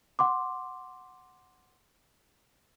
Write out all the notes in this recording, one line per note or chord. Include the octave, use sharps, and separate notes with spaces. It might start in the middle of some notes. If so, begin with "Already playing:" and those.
F#5 C6 D6